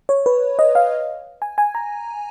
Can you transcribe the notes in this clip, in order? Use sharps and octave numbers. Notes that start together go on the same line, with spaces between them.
C#5
B4
D#5
F5
G#5
G#5
A#5